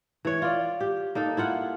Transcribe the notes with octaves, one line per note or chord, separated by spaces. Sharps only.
E3 C#5
F4 D5
G4
A#3 D#4 A4
E4 F4 F#5